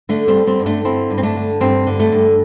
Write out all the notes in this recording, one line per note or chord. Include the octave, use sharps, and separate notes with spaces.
D3 A3 D4
G3 C4
D3
G3 C4
G2
A3 D4
D3 C4 E4
G2
C4
A3 D4
D3
G2 G3 C4
D3
A3
G2